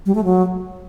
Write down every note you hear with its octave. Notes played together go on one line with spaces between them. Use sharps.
G3
A3
F#3